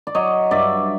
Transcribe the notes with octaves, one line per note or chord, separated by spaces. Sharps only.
D5
F#3 C#5 D#5
G2 D5 E5